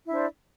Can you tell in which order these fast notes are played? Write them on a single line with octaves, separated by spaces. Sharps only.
E4 D4 C5 D5